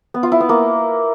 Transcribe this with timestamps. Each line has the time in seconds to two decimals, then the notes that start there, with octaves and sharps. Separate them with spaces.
0.14 B3
0.23 F4
0.32 E4
0.40 B3
0.49 A#3